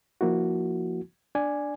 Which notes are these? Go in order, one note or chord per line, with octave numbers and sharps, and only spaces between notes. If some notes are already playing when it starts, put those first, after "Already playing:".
F3 A#3 E4 F#4
D4 D5 G#5